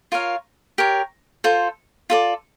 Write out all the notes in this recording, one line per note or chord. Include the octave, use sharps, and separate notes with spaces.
F4 A#4 C#5 F5
G4 A#4 C#5
F4 A4 C5
F4 A4 D5